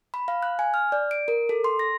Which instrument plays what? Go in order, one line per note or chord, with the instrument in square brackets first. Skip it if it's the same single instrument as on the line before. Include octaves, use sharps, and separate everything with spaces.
[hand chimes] B5
F5
F#6
G#5
F6
D5
D7
A#4
A4
C6
A#6